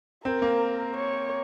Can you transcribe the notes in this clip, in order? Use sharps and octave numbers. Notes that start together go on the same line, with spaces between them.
C4 A#4
A#3
C#5